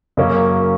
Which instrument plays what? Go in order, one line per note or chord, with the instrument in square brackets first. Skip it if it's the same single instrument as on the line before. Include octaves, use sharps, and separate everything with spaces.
[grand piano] F#2 C#3 F#3 A#3 C#4